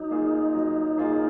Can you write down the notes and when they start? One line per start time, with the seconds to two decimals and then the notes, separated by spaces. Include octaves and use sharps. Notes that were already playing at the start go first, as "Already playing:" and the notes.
Already playing: F#3 D#4
0.11 A#3 F4 G#4
0.54 F#3
0.98 A#3 F4 G#4